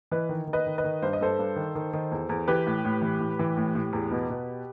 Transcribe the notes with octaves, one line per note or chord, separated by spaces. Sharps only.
E3 B4 D#5
D#3
D#3
B4 D#5
D#3
B4 D#5
D#3
G2 C5
D#5
G2 A4 C5
G2
D#3
D#3
D#3
E2
E2
E3 G4 B4
A2
A2
E3
A2
E3
A2
A2
E2
B2
B2